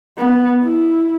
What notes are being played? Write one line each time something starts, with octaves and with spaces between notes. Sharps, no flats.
B3
E4